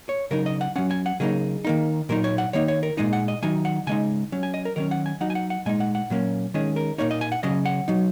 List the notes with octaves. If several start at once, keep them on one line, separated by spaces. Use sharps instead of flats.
C#5
C#3 F#3 D#4 A#4
D#5
F#5
F#3 C#4 F#5
G#5
F#5
C#3 F#3 A#3 D#4 G#4
D#3 A#3 D#4
A#2 F#3 D#4 A#4
C#5
F#5
D#3 A#3 D#4 C#5
C#5
A#4
A#2 G#3 D#4 D#5
F#5
D#5
D#3 F#3 D#4 G#5
F#5
C#3 G#3 D#4 G#5
F#3 C#4
G#5
D#5
A#4
D#3 F#3 C#4 A#4
F#5
G#5
F#3 D#4 F#5
G#5
F#5
F#5
A#2 G#3 D#4 G#5
F#5
F#5
A#2 F#3 A#3 C#4
D#3 G#3 C#4 G#4
A#4
A#2 A#3 D#4 C#5
D#5
G#5
F#5
C#3 F#3 C#4 D#5
F#5
F#3 D#4